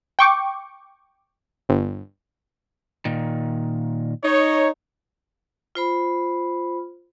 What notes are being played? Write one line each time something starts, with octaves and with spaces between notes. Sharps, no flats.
G5 C#6 D6
G1
A#2 D#3
D#4 C#5
F4 C5 B5